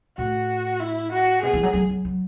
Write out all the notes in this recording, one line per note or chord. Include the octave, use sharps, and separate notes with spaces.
A2 F#4
E4
F#4
B2 G#4
E3
F#3
F#3
F#3
F#3